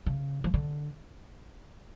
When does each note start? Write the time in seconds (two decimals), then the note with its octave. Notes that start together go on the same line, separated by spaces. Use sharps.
0.06 C#3
0.44 F3
0.54 D3